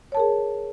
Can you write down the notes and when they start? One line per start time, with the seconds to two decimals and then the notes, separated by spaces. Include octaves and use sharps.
0.12 C#5
0.15 A5
0.17 A#4
0.20 G#4